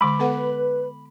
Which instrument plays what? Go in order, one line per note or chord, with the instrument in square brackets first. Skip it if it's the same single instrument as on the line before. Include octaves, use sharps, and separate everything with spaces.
[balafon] D3 G#3 [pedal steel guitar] B5 D6
[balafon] B3 A4 F#5 [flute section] B4